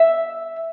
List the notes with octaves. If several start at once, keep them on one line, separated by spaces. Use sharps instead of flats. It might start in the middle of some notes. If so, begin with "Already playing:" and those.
Already playing: E5